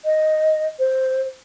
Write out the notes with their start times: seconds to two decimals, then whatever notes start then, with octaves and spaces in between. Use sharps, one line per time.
0.05 D#5
0.79 C5